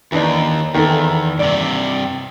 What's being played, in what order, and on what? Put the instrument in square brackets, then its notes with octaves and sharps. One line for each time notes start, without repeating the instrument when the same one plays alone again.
[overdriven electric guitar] D#2 [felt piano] E3 D4 D#4
[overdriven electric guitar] E2 [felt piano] D#3 A4
[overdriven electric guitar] G2 C3 [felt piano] D5